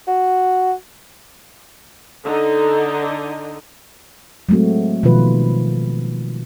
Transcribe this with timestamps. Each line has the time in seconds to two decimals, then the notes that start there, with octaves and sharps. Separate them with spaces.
0.07 F#4
2.24 D3 D#4
4.49 F#3 G#3 A3 C4 F#4
5.03 B2 D#3 F3 F4 B4